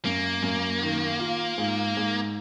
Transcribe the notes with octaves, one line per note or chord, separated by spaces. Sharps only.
F#2 A#3
F#2
D#3
F4
G#2
G#2